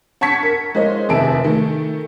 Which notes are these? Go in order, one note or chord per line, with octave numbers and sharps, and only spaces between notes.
F#5 A5 C#6 G#6 B6 C#7
A#4
G#3 A#3 E4 C5 C#5 D#5
F1 D#2 G#4 E5 A5 D7
D#3 A3